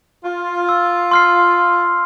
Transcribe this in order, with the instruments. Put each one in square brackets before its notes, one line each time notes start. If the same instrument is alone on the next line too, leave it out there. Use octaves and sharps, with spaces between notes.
[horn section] F4
[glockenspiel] E6
C6 F6 C7